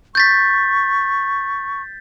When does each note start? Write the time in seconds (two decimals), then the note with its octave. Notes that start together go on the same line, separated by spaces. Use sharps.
0.15 C#6 G6 A6 B6